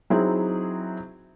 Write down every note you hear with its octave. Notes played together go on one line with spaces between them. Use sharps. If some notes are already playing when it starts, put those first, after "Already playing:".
F#3 C4 D#4 E4 G#4